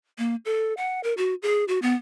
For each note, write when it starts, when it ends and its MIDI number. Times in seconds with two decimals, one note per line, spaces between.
0.18 0.36 58
0.45 0.73 69
0.77 1.00 78
1.04 1.13 70
1.17 1.35 66
1.42 1.64 68
1.68 1.79 66
1.82 1.94 59